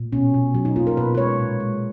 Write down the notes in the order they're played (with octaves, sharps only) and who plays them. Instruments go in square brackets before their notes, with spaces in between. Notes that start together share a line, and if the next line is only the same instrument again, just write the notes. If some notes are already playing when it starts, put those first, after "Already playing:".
Already playing: [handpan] A#2
B2 C#4
B2
F#3
D#4
A#3 F4
A#4
B2 B4
B4
G#3 C#5
A#2
G#3